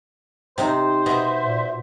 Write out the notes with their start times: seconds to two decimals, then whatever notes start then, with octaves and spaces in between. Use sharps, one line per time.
0.58 C3 C4 D#4 C5
1.06 B2 D#5 E5
1.46 A#2